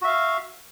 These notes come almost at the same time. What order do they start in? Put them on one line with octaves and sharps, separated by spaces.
F#4 E5 F5